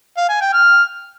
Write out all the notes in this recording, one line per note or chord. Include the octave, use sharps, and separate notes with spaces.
F5
G#5
G5
F6